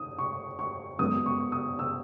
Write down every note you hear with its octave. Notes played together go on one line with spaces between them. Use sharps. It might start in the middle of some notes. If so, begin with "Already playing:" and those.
Already playing: D#3 D#6
C#6
C#6
F#2 D#3 G#3 B3 D#6
C#6
D#6
E6